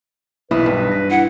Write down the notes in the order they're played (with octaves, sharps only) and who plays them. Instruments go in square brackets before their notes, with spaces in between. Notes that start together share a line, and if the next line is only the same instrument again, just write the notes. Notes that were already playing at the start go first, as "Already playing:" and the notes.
[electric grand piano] B1 E3 D#6 [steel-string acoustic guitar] E4 [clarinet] B4
[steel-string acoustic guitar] G2
[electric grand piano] A#6
[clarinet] E4 [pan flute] F#5